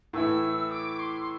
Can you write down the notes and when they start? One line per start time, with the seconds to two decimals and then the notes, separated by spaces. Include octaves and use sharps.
0.13 A2 E3 A3 E4 E6
0.71 D6
0.99 C6
1.21 C6